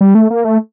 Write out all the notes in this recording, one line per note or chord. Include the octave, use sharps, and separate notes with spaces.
G3
A3
A#3
A3